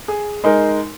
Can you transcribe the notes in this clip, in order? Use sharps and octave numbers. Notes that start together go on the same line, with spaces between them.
G#4
G#3 D#4 A#4